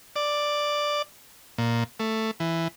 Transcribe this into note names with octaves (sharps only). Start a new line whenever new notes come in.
D5
A#2
A3
E3